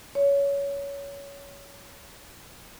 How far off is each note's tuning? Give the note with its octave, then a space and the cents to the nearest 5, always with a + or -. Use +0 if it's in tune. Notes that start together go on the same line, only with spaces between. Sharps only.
C#5 +20